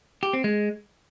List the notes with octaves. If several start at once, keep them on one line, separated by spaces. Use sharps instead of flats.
G4
C4
G#3